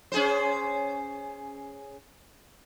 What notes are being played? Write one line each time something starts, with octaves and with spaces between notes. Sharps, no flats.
C#4 G#4 C5